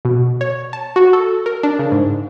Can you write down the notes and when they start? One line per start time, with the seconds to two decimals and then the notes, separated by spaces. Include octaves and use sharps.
0.05 B2
0.41 C#5
0.73 A5
0.96 F#4
1.13 A4
1.46 A#4
1.63 D4
1.79 C#3
1.92 G#2